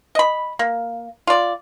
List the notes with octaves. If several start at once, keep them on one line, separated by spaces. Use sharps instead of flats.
D#5 B5
A#3
F4 D5